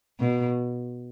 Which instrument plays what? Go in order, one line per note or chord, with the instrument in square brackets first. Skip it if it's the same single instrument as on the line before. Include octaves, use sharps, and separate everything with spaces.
[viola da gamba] B2